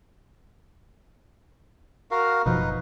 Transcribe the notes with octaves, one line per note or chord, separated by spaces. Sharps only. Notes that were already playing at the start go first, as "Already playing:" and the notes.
F#4 A#4 F5
F#1 B2 F3 D#4 B4